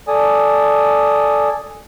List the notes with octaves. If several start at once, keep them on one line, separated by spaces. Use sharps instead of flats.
A4 D5 G#5 D#6